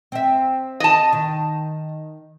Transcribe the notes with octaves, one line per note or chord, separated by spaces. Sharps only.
C4 E5
D#5 A5
D#3